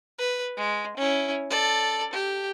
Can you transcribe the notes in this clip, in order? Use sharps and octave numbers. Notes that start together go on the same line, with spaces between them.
B4
G#3
C#4 E4
A4 D5
G4